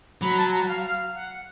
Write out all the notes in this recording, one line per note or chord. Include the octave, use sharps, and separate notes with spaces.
F#3 B5
A5
A#5
F#5
F5
F5
F#5